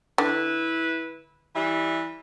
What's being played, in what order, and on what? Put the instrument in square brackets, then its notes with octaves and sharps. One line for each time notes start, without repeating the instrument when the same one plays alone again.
[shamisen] D3 [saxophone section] E4 B4
[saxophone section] E3 G3 E5